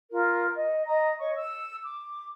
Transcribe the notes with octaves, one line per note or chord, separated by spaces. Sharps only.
F4 A#4
D#5
D#5 A#5 D#6
C#5 D#5 C#6
E6
D6